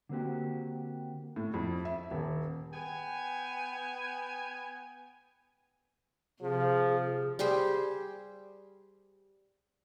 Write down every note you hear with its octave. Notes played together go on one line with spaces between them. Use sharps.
D3 A#3 C4 F#4 G4
A2
F2
E5
D#1
B3 G5 G#5
C3 F3 G#4
G3 G4 G#4 C5